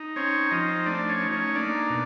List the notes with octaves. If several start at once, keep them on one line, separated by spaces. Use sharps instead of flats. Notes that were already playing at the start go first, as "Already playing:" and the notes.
Already playing: D#4
C4 C#4 C#5
F3 D#4 D#5
A3 D4 D5
C#4 C#5
D#4
C#4 C#5
A#3 D4 D5
B2